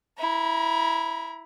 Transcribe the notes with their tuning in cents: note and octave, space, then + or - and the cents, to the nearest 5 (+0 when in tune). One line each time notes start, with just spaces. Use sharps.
E4 +0 A#5 +40